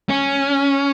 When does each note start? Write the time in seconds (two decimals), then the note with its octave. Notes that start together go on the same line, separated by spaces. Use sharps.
0.09 C#4